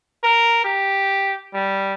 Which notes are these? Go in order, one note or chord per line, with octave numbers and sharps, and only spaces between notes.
A#4
G4
G3